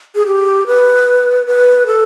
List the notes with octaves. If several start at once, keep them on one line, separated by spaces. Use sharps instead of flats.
G#4
G4
B4
B4
A4